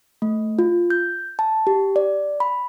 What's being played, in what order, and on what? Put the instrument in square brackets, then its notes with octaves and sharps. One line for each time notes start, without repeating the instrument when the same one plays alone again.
[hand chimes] A3
F4
G6
A5
G4
D5
B5